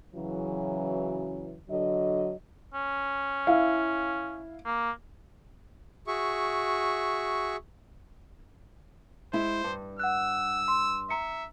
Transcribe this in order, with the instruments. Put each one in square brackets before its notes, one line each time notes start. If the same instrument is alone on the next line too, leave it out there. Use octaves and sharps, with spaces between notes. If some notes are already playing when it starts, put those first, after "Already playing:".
[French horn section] C#3 E3 F#3
D3 F#3 D#5
[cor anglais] C#4
[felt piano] E4 F5
[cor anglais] A#3
[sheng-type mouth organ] F#4 G#4 E5 C#6
[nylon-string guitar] G#3 E4 [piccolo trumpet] C5
[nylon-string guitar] G2
[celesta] F#5 F#6 [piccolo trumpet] E6
[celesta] C6
[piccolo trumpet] E5 [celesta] A#5 C#7